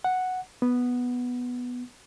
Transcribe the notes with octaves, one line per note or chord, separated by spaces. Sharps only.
F#5
B3